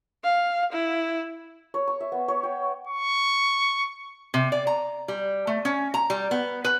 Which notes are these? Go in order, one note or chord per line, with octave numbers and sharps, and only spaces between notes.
F5
E4
C#5
C#6
E5
B3
C#5
G5
C#6
C3
D5
A#5
G3
A3
C#4
A#5
G3
B3
B4